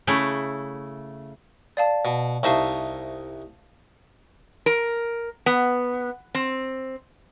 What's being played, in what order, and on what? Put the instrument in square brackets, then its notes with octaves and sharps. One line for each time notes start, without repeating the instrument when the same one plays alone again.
[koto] C#3 A3 E4
[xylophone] D5 F5 A5
[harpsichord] B2
[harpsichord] C2 D#4 E5 [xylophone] F5 A5 C#6
[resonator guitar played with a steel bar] A#4
B3
C4